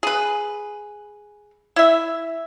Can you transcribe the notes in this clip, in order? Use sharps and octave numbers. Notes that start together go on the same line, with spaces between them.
G#4 B4
E4 E5